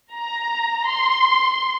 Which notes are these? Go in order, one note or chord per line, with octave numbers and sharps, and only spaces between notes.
A#5
C6